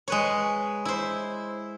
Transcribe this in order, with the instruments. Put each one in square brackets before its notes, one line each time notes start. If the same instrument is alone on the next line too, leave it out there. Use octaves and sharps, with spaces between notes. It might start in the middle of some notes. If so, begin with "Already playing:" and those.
[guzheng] G#3 B4 C#5
E4 C5